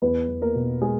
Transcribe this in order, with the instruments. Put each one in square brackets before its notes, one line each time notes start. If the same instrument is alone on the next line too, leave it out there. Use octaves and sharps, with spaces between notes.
[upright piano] E2 B3 B4
E2
A#3 A#4
B2
G#3 G#4